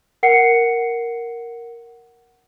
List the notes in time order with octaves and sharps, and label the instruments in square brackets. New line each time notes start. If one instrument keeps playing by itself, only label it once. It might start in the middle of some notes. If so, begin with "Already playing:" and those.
[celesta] A#4 F#5 C7 C#7